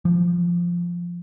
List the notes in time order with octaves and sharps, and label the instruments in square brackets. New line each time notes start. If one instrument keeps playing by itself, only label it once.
[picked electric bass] F3